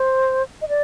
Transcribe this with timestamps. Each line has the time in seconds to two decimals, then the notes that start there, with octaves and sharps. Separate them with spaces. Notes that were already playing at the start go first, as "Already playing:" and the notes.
Already playing: C5
0.62 D#5
0.69 D5